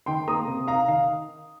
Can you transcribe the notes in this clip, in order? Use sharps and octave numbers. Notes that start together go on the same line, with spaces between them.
D#3 G5 C6
A#3 A#5 D#6
C3
D#4 F5 A#5
D#3 F5